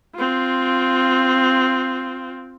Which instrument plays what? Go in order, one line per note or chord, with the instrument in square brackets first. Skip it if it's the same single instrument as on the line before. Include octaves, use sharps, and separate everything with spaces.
[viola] C4 F4